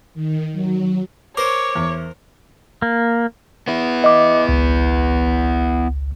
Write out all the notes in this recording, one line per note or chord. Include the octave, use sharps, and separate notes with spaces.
D#3
F#3
A#4 C5 C#5 D6
E2
A#3
B3 E4
D#5 D6
G#1 C#2